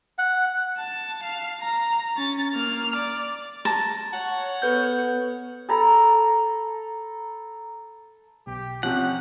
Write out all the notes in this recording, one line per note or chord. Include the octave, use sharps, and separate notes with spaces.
F#5
A5
F5
A#5
C#4 A6
A#3 F6
D5
A5 A#5
C#5 F#5
B3 A4 B4 G6
A4 A#5 B5
B1 G4
C3 F3 C#4 F#5